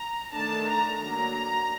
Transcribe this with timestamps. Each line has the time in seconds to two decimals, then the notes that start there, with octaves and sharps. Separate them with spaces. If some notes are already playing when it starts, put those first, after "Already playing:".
Already playing: A#5
0.31 D#3 A3 D4 A5
0.66 A#5
0.99 F#3 A#3 D4 A#5